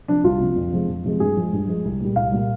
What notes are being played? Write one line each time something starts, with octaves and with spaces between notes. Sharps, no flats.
C3 F3 D4
C2 F4
C3 F3
F2
C3 F3 G#3
F2
C3 F3 G#3
G2 G#4
F3 G#3
G2
F3 G#3
C2
A#2 G3
C2 F5
A#2 G3